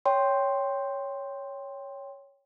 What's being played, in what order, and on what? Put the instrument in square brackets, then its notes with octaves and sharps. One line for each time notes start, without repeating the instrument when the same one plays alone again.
[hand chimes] C#5 G5 C6